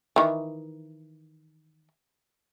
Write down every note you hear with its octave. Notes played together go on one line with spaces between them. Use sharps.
D#3 E3